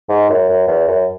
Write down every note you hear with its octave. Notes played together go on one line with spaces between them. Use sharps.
G#2
F#2
F#2
E2
F#2